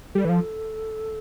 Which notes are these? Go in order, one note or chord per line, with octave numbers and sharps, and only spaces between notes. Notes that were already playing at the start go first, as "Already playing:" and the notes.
G3 A4
E3
F3